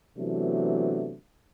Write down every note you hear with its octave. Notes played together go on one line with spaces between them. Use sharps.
C3 E3 F#3 A3 B3 D4